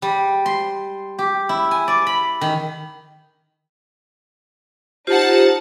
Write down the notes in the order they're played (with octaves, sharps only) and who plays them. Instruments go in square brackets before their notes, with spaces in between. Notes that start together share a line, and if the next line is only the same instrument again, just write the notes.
[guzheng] G3
C6
G4
E4
G#5
D5
B5
D#3
[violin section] D#4 F#5 A5 [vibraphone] F4 G4 C5